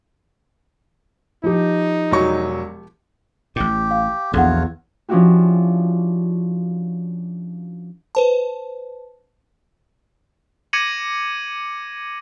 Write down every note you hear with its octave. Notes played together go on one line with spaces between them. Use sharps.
F3 D#4 G4
E1 F#3 C#6
A1 A2 G4
F5
A#1 E2 F4 F#4 A4 C#5 F#5
F3 C#4 D4 E4 F#4 G4
B4 C5 A5
D6 G#6 A#6 C#7 D#7 F#7